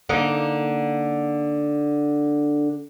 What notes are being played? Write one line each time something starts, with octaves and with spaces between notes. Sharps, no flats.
D3 A#3 D#4